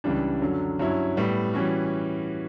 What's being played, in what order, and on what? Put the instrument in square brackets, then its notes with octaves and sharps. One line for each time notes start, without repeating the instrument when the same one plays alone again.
[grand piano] C#2 C#3 E3 G3 D4
F#2 D3 F#3
G2 F#3 C#4 E4
A2 G3 B3
E3 G3 C#4 F#4